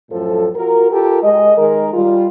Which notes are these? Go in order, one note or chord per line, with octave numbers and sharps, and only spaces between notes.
F#2 A2 F3 A4
F4 F#4 A#4
F4 G4 A4 A#4
G#3 D#5
D#3 G#3 A#4
G3 F4